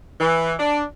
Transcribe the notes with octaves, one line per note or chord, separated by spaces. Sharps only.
E3
D4